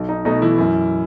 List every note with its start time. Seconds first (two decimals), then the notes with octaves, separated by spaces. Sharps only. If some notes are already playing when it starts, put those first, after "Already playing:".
Already playing: B1
0.09 D#4
0.25 B2 A3 D#4
0.42 E3 E4
0.59 F#2